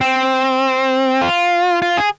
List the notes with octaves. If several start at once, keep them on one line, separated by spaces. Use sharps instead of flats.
C4
F4
F4
G#4